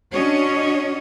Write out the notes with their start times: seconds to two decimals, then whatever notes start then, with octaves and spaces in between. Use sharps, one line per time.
0.14 C#4 D4 F#4 C#5 D#5